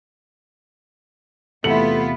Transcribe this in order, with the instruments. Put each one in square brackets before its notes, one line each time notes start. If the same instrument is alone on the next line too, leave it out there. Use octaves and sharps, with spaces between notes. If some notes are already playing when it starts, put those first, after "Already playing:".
[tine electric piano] E2 C3 [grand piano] A3 C#7 F#7 [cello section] B3 E4 F4